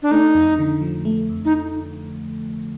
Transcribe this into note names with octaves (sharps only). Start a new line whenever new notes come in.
D4
A3 D#4
F2
D3
F3
A3
F2
D#4